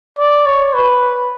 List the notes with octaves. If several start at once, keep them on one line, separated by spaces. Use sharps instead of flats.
D5
C#5
B4